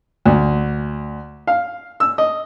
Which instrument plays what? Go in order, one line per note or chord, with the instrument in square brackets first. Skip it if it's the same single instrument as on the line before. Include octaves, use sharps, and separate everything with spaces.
[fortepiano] D2
F5
E6
D#5